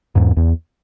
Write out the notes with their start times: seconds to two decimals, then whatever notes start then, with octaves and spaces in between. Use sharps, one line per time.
0.15 E2 G#2
0.37 E2